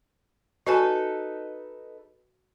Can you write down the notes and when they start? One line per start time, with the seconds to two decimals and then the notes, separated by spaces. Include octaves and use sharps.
0.67 D#4 F#4 A4 B4 G#5